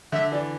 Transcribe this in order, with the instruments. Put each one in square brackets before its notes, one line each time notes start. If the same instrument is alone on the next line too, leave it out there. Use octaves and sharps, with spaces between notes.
[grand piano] D3 [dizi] E5
[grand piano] E3 [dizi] D5